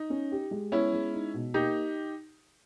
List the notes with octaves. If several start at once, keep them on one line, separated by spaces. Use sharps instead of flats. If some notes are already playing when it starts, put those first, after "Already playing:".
Already playing: D#4
C#4
G4
G#3
B3 C#4 E4
G#3
D#4
B2
A#3 D#4 G4